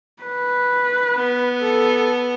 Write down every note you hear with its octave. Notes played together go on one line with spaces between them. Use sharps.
B4
B3
A4